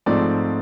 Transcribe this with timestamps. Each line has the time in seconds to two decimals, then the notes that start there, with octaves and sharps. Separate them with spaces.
0.06 G#2 F3 A3 C4 D5